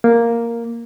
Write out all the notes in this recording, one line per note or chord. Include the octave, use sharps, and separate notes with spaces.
A#3